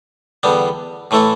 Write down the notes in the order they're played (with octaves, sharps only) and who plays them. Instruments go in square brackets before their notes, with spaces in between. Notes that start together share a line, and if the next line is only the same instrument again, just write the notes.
[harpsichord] E2 D3 G3 B3
A2 E3 A3 E4 A4